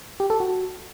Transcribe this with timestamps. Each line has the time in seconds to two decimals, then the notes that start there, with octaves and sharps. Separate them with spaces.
0.20 G4
0.30 A4
0.40 F#4